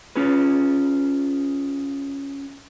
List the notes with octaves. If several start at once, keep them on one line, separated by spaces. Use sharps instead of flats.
C#4 F4 G#4 B4